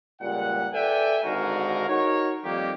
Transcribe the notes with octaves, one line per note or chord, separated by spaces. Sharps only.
C#2 A#2 G3 F#5
A4 B4 D5 E5 G5 G#5
G#1 G#2 D3 F#4 A#4 F5
D#4 F#4 A#4 C#5
F2 D#3 G3 A#3 D#4 G4